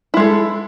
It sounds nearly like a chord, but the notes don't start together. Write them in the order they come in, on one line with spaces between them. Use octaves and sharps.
E4 G#3 A4